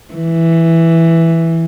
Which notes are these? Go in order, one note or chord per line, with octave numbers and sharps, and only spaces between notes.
E3